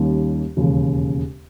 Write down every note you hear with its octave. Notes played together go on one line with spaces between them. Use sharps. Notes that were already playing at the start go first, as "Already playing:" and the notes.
Already playing: D#2 D#3 G3 A#3 C#4
E1 D#2 C#3